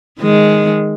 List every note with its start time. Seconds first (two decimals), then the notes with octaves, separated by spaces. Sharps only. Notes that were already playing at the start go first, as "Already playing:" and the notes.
0.19 D#3 G#3